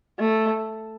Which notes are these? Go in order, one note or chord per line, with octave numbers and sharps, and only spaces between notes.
A3